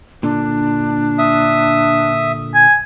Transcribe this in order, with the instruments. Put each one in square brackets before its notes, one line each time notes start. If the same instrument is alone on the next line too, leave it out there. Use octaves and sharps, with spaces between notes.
[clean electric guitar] A#2 D3 [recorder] D4
[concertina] E5 D#6
[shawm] G#5